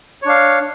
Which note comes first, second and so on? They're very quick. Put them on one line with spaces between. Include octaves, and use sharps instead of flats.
C#5 D4 F5